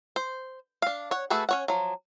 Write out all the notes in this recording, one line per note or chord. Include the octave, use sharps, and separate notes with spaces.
C5
D4 F5
C#5 F#5
A3 F#4 G#4 A4 B4
C#4 C#5 F#5
F3 F#3